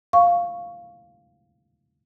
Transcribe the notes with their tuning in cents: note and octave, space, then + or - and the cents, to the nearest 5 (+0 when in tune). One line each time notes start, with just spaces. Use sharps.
F5 +0 C#6 +0